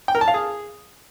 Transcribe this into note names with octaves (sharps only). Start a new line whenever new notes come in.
G5
A#4
A5
F5
G#4